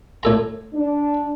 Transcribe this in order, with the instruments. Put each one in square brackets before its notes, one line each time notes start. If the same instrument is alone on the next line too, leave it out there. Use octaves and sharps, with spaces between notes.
[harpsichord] A2 A4 A#5
[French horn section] D4